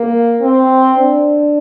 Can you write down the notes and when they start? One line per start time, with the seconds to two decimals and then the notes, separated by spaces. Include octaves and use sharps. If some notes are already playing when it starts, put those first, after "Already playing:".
Already playing: A#3
0.41 C4
0.98 D4